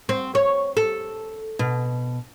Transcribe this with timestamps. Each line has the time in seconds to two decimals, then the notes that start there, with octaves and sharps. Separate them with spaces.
0.09 C4
0.35 C#5
0.77 A4
1.59 B2